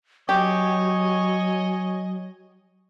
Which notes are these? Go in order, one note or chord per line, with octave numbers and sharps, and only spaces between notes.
F#3 G4 C#5 D#5 G#5